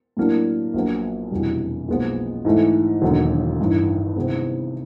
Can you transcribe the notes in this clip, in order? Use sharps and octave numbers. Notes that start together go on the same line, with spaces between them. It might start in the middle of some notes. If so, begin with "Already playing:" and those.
A2 F#3 A#3 D4
A#1 A#2 F#3 B3
F1 E2 B2 G3
B1 A#2 F3 G#3 B3
G#2 E3 A3
E1 D#2 D3 F#3
A1 G2 D#3
C3 D#3 G#3 B3